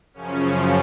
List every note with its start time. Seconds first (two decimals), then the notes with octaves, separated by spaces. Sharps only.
0.14 F#2 C#3 F3 C#4
0.43 C#4